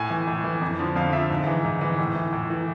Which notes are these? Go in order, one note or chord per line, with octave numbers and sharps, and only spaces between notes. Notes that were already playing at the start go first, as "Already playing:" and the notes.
Already playing: A2 G#5
E3
A2
E3
F2
D3 F3
F2 F5
D3 F3 E5
G#2
E3
G#2
E3
A2
E3
A2
E3